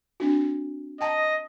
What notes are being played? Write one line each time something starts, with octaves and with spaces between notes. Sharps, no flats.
C4 D4 F#4
D#5 G5 A5 A#5